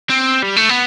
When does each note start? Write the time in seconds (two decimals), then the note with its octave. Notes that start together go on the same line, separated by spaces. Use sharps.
0.10 C4
0.43 G3
0.56 A3
0.69 B3